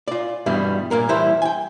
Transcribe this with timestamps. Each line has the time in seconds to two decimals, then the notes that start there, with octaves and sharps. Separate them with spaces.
0.08 F4 D5
0.46 G2 B2 E3 G3
0.91 A#2 A#3 A#4
1.09 E3 G3 E4 G4 C5
1.42 G5 G#5